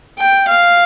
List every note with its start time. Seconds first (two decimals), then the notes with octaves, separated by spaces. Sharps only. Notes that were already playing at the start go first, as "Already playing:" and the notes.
0.19 G5
0.48 F5